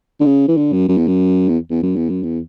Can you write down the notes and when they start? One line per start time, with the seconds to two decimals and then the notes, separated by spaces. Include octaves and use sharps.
0.20 D3
0.26 C#3
0.48 E3
0.57 D3
0.73 F#2
0.88 F#2
0.97 E2
1.08 F#2
1.49 E2
1.70 E2
1.82 F#2
1.96 E2
2.09 F#2
2.23 E2